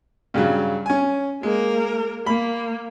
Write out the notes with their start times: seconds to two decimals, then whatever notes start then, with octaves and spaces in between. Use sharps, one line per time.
0.34 G2 C#3 F#3
0.86 C#4 G#5
1.43 G#3 A#3 A#4
2.26 A#3 B5